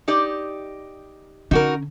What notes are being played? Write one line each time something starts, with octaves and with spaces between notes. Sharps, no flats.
D#4 G4 D5
D3 C#4 D#4 F#4 A#4